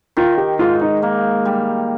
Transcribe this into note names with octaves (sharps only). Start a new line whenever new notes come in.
D#3 F4
G4
G#2 F4
D#4
A#3
G3